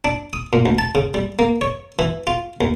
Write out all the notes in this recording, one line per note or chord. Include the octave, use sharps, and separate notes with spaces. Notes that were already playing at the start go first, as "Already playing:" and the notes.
D4
D#6
A#2
D2
A5
C#3
G3
A#3
C#5
E3
F4
D#2